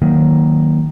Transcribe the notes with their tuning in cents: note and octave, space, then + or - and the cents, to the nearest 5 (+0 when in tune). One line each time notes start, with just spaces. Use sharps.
D#3 +0 F#3 +0 A#3 +0